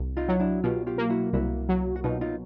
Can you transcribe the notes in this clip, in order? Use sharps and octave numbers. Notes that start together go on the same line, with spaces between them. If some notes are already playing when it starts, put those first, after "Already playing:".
Already playing: C2
D#4 F4
F#3
D4 E4
B2 F4 G4
F4 G4
A#3
E4 F#4
C2 E4 F#4
F#3
F#4
B2 D#4 F4
D#4 F4